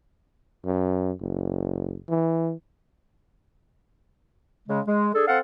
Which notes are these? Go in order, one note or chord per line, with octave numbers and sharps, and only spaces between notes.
F#2
F#1
E3
C#3 G#3
G#3
D4 G#4 A4
C4 A4 F5 F#5